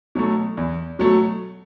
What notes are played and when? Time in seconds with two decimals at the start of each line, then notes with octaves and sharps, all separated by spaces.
0.15 B2 F#3 A3
0.57 E2
0.99 B2 F#3 A3